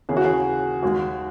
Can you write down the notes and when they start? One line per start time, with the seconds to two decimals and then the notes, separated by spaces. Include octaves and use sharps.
0.09 D#2 C#3 E3 A#3 C#4 G#4
0.16 F#4
0.24 G#4
0.83 D#2 D#3 G#3 F#4